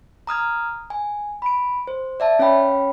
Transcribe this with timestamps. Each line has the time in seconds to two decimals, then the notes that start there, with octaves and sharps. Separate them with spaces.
0.27 A#5 D#6 F6 G#6
0.90 G#5
1.42 B5 D7
1.87 C5
2.20 D5 E5 A5
2.39 C#4 C#5 F5 G5 B5